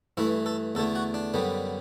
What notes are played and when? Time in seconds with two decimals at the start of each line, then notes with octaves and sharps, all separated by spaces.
0.17 G2 E3 A3 E4
0.46 A4
0.75 E2 D3 A3 A4
0.95 F#4
1.14 D4
1.34 F#2 D3 G3 B3